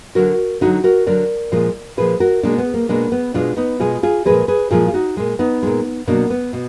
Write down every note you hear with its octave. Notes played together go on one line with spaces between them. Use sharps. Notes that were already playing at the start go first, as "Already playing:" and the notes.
D3 F#3 F#4 A#4
D3 F#3 D#4 F#4
F#4 A#4
D3 F#3 A#4 D5
A#2 F3 G#3
A#2 F3 G#3 G#4 B4
F#4 A#4
B2 G#3 A#3 D4
B3
A#3
B2 G#3 A#3 D4
B3
B2 G#3 D4 F4
B3 D#4
B2 G#3 F4 G#4
F4 G#4
A#2 F3 G#3 G#4 B4
G#4 B4
A#2 F3 G#3 F4 G#4
F4
D#4 F#4
A#2 G#3
B3 D#4
A#2 G#3
B2 F#3 A#3 D4
B3
B2